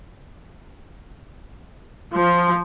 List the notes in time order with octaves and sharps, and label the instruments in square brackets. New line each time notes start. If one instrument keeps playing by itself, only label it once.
[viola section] F3